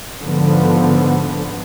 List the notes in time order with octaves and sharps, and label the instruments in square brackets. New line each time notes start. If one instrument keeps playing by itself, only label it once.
[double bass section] G#2 D3 F3 B3